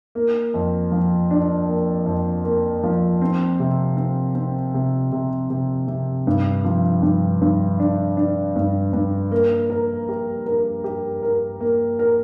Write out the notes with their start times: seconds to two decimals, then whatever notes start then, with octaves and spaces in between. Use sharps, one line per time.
0.15 A#3
0.54 F2
0.92 F3
1.31 D4
1.68 A#3
2.06 F2
2.44 A#3
2.83 F3
3.22 C4
3.60 C3
3.97 C4
4.35 C4
4.74 C3
5.12 C3
5.50 C3
5.88 C3
6.27 G2
6.64 F3
7.02 G2
7.41 G2
7.80 D4
8.17 D4
8.56 G2
8.93 G2
9.31 A#3
9.70 A#4
10.09 G4
10.46 A#4
10.84 G4
11.23 A#4
11.60 A#3
11.99 A#4